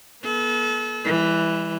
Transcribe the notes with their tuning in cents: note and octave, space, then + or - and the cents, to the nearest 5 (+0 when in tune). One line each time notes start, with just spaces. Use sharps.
B3 -40 A4 -35
E3 +0 G3 +40